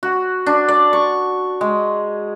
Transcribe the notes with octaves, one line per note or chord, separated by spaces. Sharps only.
F#4
D4
D5
C#6
G#3